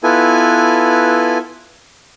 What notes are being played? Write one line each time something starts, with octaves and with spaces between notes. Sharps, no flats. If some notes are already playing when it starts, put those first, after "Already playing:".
B3 E4 F4 A4 B4 G#5